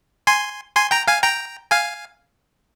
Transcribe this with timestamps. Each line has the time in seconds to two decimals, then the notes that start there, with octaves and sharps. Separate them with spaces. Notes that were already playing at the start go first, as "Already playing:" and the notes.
0.27 G#5 C6
0.76 G#5 C6
0.91 G5 A#5
1.08 F5 G#5
1.23 G5 A#5
1.71 F5 G#5